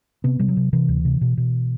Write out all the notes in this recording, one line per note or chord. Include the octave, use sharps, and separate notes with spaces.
C3 B3
C3 G3
F#3
C3
C3 E3
D2
C3
B2
B2